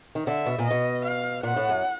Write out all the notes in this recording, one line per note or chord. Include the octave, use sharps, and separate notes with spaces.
D#3
D3 E5
B2
A#2
D#5
B2
F5
A#2 F#5
A2
F#2